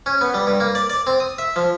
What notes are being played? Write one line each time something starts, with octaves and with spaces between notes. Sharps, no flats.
C#4
B3
G3
G2
A#3
D5
D5
C4
D#6
E5
F3